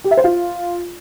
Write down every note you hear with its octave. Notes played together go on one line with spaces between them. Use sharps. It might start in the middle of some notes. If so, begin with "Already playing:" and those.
G4
E5
C5
F4